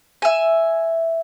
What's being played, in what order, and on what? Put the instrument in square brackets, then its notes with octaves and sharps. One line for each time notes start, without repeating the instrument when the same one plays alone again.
[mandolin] E5 G#5